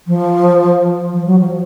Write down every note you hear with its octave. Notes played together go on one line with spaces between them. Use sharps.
F3
F3
F#3
F3